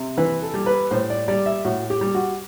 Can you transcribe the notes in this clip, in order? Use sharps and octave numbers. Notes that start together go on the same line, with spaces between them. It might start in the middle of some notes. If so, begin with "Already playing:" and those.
Already playing: C3
E3 B4
A4
G3
B4
A2 C5
D5
G3 D5
E5
A2 F#4
G4
G3
F#4